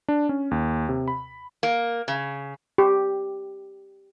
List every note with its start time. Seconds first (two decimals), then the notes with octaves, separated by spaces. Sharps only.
0.08 D4
0.29 C#4
0.51 D#2
0.89 C3
1.08 B5
1.63 A#3
2.08 C#3
2.78 G4